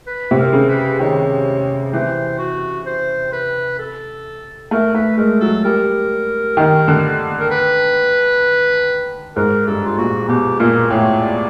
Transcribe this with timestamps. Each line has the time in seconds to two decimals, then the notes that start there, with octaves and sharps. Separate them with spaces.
0.07 B4
0.31 C3
0.39 A#4
0.53 C#3
0.69 B4
1.00 D#3 C#5
1.93 E3 C5
2.39 F#4
2.86 C5
3.33 B4
3.79 A4
4.71 A3 A#4
4.94 A3 B4
5.17 G#3 A#4
5.41 F#3 A4
5.64 G3 A#4
6.57 D#3
6.88 D3
7.39 A#4
7.51 B4
9.36 G#2 A#4
9.67 G2 A4
9.87 F4
9.98 A#2 F#4
10.28 B2 G4
10.59 A#2 A#4
10.90 A2 C#5
11.22 D5